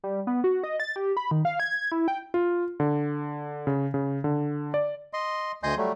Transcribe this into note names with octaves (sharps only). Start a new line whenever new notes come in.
G3
B3
F#4
D#5
A6
G4
B5
D#3
F5
G#6
E4
G5
F4
D3
C#3
C#3
D3
D5
D#5 C6
D2 D#5 G#5 C6 D#6 G6
F#3 G3 A3